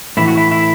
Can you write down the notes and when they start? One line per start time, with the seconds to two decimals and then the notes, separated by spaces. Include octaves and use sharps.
0.17 A2 E3 E4
0.28 F#4
0.37 E4
0.52 E4